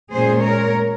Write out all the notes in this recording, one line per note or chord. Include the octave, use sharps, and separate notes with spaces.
A#2 G#3 C#4 G#4 C5
A#4 C#5